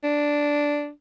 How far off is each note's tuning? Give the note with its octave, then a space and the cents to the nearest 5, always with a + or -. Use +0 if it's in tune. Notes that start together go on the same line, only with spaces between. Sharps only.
D4 -5